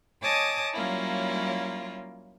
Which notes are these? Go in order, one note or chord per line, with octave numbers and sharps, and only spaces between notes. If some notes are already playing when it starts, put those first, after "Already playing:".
C#5 D#5 G#5 A5 D6 D#6
F#3 G3 A#3 C#4 E4 F4